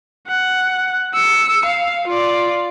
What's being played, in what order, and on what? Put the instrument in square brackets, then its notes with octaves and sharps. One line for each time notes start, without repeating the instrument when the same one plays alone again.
[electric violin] F#5
E6 C#7
F5
F4 D5